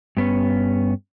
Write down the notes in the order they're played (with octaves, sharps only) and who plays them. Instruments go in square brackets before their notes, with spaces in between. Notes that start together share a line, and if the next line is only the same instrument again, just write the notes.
[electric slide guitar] G2 B3 C#4